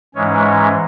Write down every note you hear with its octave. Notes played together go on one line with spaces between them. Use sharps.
G#2 E3 G#3 C#4 C#5
C#5